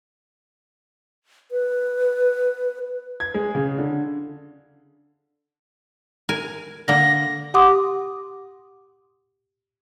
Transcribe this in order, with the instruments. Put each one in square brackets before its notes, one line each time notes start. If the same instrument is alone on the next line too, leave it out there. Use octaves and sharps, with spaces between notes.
[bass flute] B4
[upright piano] G#6
G#3
C#3
D3
[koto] A#4 G#5
[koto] D3 A#3 [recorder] A#6
[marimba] G4 F#5 C6 D6 D#6